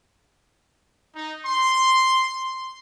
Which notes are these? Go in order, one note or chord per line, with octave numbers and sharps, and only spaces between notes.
D#4
C6